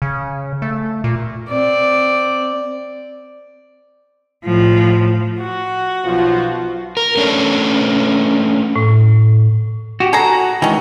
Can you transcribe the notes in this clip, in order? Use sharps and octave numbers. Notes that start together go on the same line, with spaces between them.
C#3
A3
A#2
C4 D5
A2 F3
F#4
B1 F3 F4
A#4
A3 C#4 D4
A2
F#4 G4
F#4 G#4 A4 A#5
D#3 E3 G#3 C#4